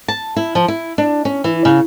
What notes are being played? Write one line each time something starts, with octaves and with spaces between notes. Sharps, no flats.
A5
E4
F3
E4
D4
C#4
E3
C#3